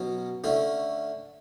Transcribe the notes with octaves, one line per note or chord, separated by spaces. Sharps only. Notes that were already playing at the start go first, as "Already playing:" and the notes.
Already playing: B2 F#3 C#4
D3 A3 C#4